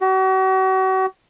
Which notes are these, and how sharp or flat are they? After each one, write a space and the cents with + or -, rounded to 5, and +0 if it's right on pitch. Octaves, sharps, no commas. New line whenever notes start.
F#4 +40